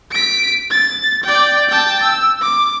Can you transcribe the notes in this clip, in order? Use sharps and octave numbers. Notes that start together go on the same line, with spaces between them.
B6 D7
A6
D5 G5
G5 A5
E6
D6